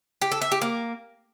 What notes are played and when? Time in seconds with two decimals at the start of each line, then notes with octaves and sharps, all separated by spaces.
0.22 G4
0.32 A4
0.42 E5
0.52 G4
0.62 A#3